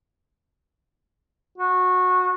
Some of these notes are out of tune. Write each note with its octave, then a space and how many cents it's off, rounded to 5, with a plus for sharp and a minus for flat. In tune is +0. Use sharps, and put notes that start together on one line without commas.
F#4 -20